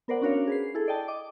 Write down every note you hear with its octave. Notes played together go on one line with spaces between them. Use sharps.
B3 A#4 C5 D5 F#5
C#4 D4 F#4 A#4 C#5 F5
G#4 B4 C7
E4 G#4 A4
D5 D#5 G5 A5
D#5 D6